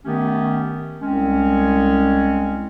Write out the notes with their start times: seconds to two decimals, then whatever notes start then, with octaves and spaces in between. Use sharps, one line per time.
0.06 D#3 A3 B3 C#4 G4
1.01 C2 G#3 C4 C#4